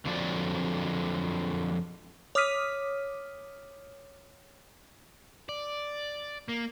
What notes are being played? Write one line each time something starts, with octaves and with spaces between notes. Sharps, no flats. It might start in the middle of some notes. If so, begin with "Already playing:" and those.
F2 D3 F3 F#3 D5
C#5 D6 D#6 F6 B6 D#7
D5
A#3